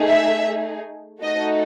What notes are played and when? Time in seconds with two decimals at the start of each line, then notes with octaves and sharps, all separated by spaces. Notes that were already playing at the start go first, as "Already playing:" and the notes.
Already playing: A3 D#4 G#4
0.09 E5
1.22 A3 D#4 F#4 A4 D#5